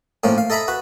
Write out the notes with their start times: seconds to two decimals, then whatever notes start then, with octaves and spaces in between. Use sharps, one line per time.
0.24 A2 F3 A#3 C#4
0.38 F5
0.50 A4 D#5 E5 A#5 B5
0.68 F#4 B4